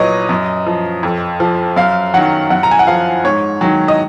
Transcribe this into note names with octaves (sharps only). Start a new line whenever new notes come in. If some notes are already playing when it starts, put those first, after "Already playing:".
Already playing: A#2 F#3 B4 C#5 D#5
F#2
F3
F2
F3
F#2 F5
D#3 F#3 F#5
F#2 F#5
A#5
G#5
F#5
F3 F5
G#2 C#5
D#3 F#3
D#5